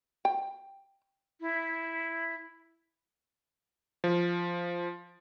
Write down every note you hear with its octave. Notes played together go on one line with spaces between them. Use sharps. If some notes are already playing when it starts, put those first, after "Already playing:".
G5
E4
F3